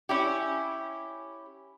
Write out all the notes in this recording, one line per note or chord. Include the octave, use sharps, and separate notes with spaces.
C#4 E4 G4